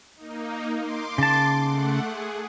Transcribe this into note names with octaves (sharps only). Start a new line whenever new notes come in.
A#3 D#4
C6 D6
C#3 A5
A3 F#5
G#4